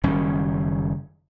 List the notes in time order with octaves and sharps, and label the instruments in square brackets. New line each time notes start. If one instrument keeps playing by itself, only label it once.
[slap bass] F#1 D#3 G3 C#4